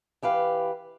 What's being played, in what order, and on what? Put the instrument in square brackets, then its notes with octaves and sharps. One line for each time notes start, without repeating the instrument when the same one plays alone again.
[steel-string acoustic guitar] E3 G4 B4 F5